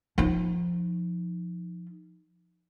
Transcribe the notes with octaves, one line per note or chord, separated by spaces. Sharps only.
F3 D#4